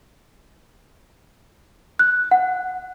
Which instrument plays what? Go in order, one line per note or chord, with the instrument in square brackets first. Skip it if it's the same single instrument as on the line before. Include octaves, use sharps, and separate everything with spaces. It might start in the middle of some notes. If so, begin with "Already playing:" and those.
[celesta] F#6
F#5